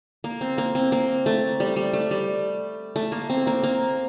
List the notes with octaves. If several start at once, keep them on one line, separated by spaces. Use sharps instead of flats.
A#3
C4
A#3
C4
A#3
A3
G3
G3
A3
G3
A3
A#3
C4
A#3
A#3